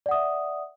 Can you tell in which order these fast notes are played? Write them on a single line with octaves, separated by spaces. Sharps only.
D5 F#5 D#6 E5